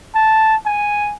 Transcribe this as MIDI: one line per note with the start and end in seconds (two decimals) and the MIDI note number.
0.15 0.56 81
0.66 1.13 80